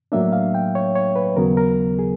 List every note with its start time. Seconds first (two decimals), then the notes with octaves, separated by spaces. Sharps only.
0.12 A2 F#3 A#3 D4 E5
0.33 F5
0.54 G5
0.75 C#5
0.95 C#5
1.16 B4
1.36 D#2 C#3 F#3 B3 A#4
1.57 A#4
1.99 G#4